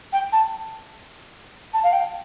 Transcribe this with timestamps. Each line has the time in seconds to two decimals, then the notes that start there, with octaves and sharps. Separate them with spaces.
0.12 G5
0.32 A5
1.73 A5
1.83 F5
1.92 G5